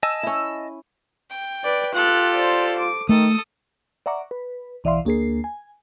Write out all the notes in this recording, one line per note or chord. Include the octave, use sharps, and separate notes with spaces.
D#5 G#5 A5 E6
C#4 E4
G5
B4 D5
F4 G4 A4 F#6
C5 D5
D6
D#3 A3 A4 D#6
D5 E5 F#5 A#5 C#6 D6
B4
B1 E3 D5 E5 F5 C6
D2 A#3 D4 G#4 A#4 C7
G#5